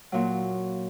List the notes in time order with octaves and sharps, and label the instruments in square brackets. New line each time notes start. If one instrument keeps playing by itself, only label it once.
[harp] A#2 F#3